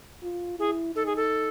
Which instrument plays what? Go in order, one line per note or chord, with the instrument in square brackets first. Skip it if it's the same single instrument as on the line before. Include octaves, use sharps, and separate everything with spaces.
[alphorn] F4
[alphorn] E4 [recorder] G#4
[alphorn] D#4 [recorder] A4
[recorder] G#4
A4